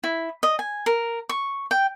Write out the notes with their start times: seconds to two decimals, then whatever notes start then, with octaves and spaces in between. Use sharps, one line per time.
0.04 E4
0.43 D#5
0.59 G#5
0.86 A#4
1.29 C#6
1.71 G5